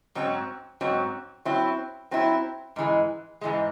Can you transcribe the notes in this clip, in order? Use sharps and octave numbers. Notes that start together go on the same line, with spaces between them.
G#2 F#3 C4
G#2 F#3 C4
F#3 C4 E4
F#3 C4 E4
G#2 E3 G#3
G#2 E3 G#3